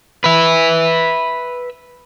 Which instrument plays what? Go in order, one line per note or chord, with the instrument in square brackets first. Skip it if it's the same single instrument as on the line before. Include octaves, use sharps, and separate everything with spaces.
[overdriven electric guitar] B4 E5